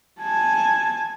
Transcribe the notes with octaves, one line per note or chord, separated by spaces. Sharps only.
G#5 A5